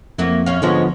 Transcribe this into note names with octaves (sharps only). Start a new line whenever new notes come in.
F2 F#3 A#3 E4
F#2 C#4 F5
G#2 D3 F3 G#3 B3 C#4